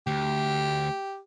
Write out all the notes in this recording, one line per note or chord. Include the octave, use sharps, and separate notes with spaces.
D2 G4